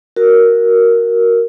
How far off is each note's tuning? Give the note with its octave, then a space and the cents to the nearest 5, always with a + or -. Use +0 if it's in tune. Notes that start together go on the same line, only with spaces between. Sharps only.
F#4 +0 A#4 +0